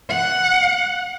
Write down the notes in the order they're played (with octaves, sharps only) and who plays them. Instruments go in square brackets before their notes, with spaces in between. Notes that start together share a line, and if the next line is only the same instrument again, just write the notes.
[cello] F#5